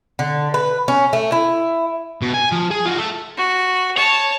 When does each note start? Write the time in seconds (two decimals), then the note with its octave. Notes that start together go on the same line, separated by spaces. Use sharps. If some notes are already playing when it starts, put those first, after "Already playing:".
0.19 D3
0.54 B4
0.88 C#4
1.13 A3
1.32 E4
2.22 B2
2.34 G#5
2.52 F3
2.71 G#4
2.86 F4 F#4
2.99 A4 E5
3.37 F#4
3.97 C#5 A5